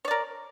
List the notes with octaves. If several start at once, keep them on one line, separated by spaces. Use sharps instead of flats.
A#4 C#5 D5